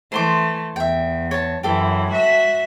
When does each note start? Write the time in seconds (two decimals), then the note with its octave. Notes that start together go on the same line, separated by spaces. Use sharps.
0.12 E3 A3 C5 C6 D6
0.76 E2 E5 G5
1.31 C#5 A5
1.63 F#2 E3 G4 A4 C5
2.11 F#4 E5